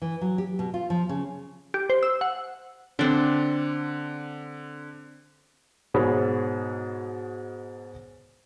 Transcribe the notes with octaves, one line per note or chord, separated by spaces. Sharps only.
E3
F#3
G4
B2
F4
F3
C#3
G4
C5
E6
F#5
D3 C4 D4
G#2 B2 G#4 C#5 B5